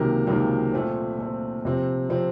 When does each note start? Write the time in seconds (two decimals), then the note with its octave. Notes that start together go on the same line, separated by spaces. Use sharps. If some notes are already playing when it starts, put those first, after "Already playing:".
Already playing: C#2 C3 D#3 F#3 A#3 A#4
0.27 C#2 C3 D#3 F#3 A#3
0.72 A#2 A3 C4
1.18 A#2 A3 C4
1.65 C3 F3 C4
2.10 C3 F3 C4